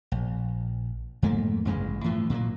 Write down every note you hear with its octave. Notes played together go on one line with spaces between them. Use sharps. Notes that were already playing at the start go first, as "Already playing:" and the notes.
A#1
F2 G#2 A3 A#3
A1 G2 C#3 G#3
A2 E3 F3
A#2 F#3 G#3 A#3